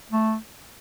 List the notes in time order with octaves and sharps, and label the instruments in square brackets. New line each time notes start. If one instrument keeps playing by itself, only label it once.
[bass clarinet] A3